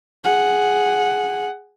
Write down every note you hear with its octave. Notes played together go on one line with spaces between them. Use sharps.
G#4 F#5